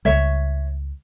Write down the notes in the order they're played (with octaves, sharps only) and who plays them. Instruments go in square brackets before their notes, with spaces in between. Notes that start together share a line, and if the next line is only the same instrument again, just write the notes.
[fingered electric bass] C#2 C#3 G3 [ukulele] C#5 E5